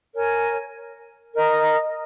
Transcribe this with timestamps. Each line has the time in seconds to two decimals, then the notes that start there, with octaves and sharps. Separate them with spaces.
0.15 A#4 C#5 G#5
1.34 A#4 D#5 A#5